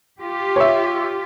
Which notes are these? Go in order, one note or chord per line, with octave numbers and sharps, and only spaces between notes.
F4 G4
C#5 E5